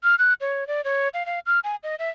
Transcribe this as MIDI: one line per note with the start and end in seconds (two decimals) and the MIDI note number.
0.03 0.15 89
0.19 0.33 90
0.41 0.67 73
0.67 0.81 74
0.84 1.08 73
1.14 1.26 77
1.26 1.39 77
1.46 1.59 89
1.64 1.76 80
1.83 1.95 75
1.99 2.10 76